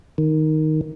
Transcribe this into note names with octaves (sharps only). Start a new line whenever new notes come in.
D#3